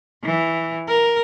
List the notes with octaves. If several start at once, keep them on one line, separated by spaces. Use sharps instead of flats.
E3
A#4